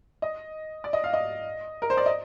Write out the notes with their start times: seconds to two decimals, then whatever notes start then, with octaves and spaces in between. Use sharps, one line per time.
0.22 D#5
0.84 D5
0.93 D#5
1.04 F5
1.14 D#5
1.82 A#4
1.90 C5
1.97 D5
2.06 D#5